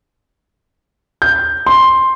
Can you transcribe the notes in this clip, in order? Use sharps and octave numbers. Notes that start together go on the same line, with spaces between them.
G6
C6